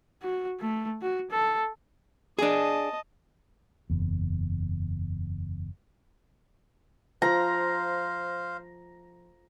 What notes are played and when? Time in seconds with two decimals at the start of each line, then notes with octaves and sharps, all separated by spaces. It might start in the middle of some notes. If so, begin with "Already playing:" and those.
0.22 F#4
0.60 A3
1.02 F#4
1.31 A4
2.39 D4 G#4 D#5 A5
3.90 F#1 E2
7.22 F3 C5 F5 A#5